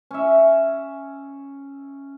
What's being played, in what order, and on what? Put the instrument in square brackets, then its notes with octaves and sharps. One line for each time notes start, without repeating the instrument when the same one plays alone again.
[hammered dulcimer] C#4 E5